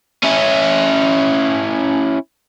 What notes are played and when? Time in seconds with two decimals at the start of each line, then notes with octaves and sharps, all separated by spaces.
0.23 C#4 E4